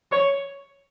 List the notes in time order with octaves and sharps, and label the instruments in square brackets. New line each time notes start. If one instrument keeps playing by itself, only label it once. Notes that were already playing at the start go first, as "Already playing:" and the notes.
[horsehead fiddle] C#5